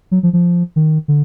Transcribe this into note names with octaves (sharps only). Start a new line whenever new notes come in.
F#3
F3
F3
D#3
D3